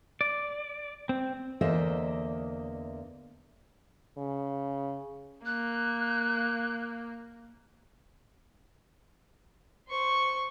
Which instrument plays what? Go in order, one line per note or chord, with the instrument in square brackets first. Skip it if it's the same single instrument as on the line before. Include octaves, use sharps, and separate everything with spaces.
[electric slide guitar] D5
C4
[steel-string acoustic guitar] E2 D3 A#3 C5 D#5 E5
[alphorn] C#3
[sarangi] A#3 [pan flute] F#6
[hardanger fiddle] C5 C#6